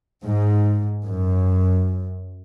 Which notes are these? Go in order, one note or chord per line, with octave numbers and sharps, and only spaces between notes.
G#2
F#2